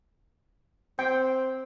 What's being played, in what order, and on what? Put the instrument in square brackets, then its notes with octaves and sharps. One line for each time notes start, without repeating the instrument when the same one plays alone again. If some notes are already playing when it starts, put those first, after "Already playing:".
[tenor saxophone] C4 [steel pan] G5